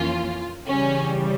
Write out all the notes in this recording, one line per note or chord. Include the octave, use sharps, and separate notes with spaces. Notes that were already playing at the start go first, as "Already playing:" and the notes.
Already playing: F2 E3 A#3 C#4 F4
C#3 E3 G3 C#4